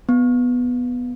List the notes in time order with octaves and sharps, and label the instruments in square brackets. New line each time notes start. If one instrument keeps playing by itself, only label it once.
[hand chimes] B3